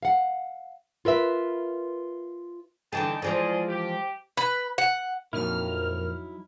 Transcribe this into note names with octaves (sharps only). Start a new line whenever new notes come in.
F5 F#5
F4 A#4 B4 E5
D3 E3 D#4 G#4 G5 A5
E3 F3 G#3 G#4 D5 D#5
G4
B4
F#5
F2 A#2 F#3 D#4 E4 A#4 F6